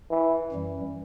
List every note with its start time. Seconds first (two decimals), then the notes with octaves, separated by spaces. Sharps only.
0.10 E3
0.52 F#2 E3 G3